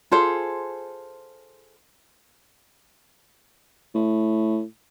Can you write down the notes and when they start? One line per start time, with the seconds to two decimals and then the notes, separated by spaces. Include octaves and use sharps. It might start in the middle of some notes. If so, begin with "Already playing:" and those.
0.11 F4 G#4 A4 C5
3.95 A2